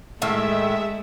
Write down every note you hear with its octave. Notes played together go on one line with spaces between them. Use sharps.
A2 D#3 G#3 A3 E5